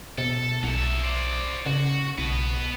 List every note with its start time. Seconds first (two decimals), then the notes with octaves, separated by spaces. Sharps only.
0.18 B2 A4
0.63 B1 F#3 E5
1.03 C5 D5
1.66 C#3 F#4
2.18 B1 B2 B3